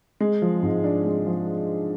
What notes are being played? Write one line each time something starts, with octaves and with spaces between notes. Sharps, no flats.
G#3
F3
G#2
D4
G#3
F3